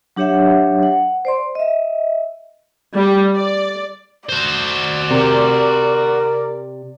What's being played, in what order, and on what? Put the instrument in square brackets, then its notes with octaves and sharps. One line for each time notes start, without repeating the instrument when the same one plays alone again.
[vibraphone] F#3 D4 G4 C#5 E5 F#5
F#5
C5 D5 C6
D#5 E5
[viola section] G3
D5
[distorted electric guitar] F#4 C5 [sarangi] D5
[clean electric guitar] C3 [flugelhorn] A#4